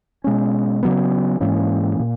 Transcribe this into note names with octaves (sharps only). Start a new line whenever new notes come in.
B2 G#3 C#4
C#3 F#3 B3
G#2 E3 A#3 C#4
A#2